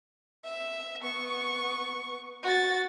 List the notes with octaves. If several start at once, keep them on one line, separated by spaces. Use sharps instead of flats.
E5
B3 C#6
F#4 A6